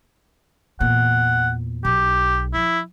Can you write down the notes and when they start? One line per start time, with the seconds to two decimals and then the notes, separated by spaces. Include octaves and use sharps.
0.80 E2 A#2 F#5
1.85 B1 G4
2.54 F3 E4